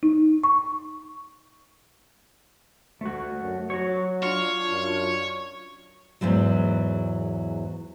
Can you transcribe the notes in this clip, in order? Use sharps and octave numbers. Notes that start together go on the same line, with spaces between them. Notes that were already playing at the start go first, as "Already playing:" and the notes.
D#4
C#6
D2 A3 F#4
F#2
F#3 F#4 C#5
D4 F4 C#5
F#2
E2 G#2 E3 F#3